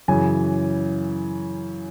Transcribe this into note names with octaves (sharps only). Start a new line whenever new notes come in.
F#2 C#3 E3 G#5